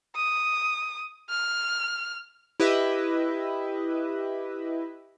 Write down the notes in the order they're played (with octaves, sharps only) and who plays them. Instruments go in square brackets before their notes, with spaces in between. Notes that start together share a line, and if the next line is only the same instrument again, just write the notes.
[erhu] D#6
F6
[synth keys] E4 G4 B4 D#5 E5